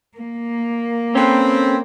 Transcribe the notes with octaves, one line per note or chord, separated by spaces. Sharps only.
A#3
C4 C#4 A4 B4